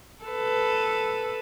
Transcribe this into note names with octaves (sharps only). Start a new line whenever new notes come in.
A4 B4